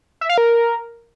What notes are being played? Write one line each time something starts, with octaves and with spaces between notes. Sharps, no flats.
E5
F5
A#4